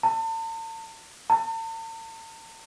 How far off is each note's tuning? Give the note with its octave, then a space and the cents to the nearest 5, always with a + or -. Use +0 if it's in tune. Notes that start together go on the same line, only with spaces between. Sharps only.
A5 +40
A5 +45